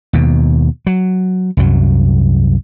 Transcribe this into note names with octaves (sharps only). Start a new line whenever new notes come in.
D#2 B2
F#3
C2 F#2 F#3